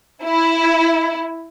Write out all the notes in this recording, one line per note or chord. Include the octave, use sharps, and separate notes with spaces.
E4